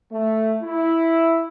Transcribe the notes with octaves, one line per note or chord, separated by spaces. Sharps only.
A3
E4